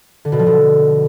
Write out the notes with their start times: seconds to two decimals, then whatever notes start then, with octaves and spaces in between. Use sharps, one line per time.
0.25 D3
0.32 B2
0.39 F3
0.46 B2